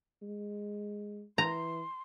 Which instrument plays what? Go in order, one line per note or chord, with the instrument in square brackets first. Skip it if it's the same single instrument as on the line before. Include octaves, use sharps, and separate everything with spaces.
[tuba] G#3
[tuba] E3 [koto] A#5 [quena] C6